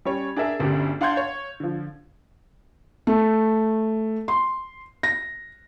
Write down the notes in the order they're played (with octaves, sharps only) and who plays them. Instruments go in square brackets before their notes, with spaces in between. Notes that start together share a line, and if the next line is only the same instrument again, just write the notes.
[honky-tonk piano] G3 C#4 C#5
D4 G#4 A#4 E5
G1 D2 C#3 D4 G4
D4 F5 F#5 C6 G6 G#6
C#5
D3 F3
[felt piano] A3
C6
A#6